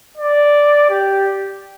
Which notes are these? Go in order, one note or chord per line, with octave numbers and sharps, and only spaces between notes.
D5
G4